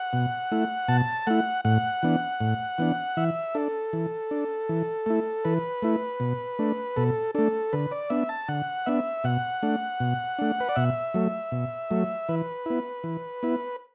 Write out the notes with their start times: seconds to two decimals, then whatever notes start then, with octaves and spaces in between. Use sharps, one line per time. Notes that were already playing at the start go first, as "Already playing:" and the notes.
Already playing: F#5
0.13 B2
0.52 A3 E4
0.88 B2 A5
1.27 A3 E4 F#5
1.65 A2 F#5
2.03 E3 B3 D4
2.41 A2
2.78 E3 B3 D4
3.17 E3 E5
3.55 D4 A4
3.93 E3
4.31 D4
4.69 E3
5.06 A3 E4
5.45 E3 B4
5.83 A3 E4
6.20 B2
6.59 A3 D4
6.96 B2 A4
7.35 A3 D4 A4
7.73 D3 B4
7.92 D5
8.10 B3 D4 E5
8.29 A5
8.48 D3 F#5
8.86 B3 D4 E5
9.24 B2 F#5
9.63 A3 D4
10.00 B2
10.39 A3 D4
10.60 B4
10.69 D5
10.76 B2 E5
11.14 F#3 A3
11.52 B2
11.91 F#3 A3
12.29 E3 B4
12.66 B3 E4
13.04 E3
13.43 B3 E4